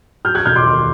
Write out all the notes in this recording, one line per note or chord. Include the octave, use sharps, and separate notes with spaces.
F#3 F6 G6
F#6 G#6
E1 F6 G6
C6 D6
D#2